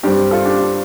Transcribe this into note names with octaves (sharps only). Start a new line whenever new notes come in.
G2 G3 C4 D4 G4
F4 A4
D4 G4
F4